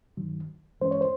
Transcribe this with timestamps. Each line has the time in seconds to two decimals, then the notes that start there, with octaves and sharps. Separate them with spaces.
0.17 G2 D#3 F#3
0.81 G2 E3 G#3 C#4 C5
0.91 C#5
1.01 C5